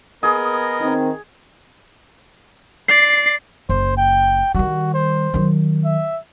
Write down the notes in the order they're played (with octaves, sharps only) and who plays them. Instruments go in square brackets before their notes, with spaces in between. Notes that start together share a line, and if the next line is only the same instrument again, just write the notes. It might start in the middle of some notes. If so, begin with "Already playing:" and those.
[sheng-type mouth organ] B3 A#4 D#5 [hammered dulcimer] G#4
[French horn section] D#3 C4
[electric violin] D5 [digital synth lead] C7
[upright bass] F#1 [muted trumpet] C5
[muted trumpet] G5
[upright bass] D#3 G3 [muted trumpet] F#4
[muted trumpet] C5
[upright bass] D#3 F#3
[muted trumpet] E5